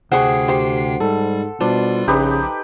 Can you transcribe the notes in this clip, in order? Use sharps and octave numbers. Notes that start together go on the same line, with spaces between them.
D2 C3 G#4 C5 F#5 G5 C#6 C7
G4 C5 C6
G#2 G3 A4
B2 G3 D4 F4 C5
A#1 C#3 D#4 G4 B4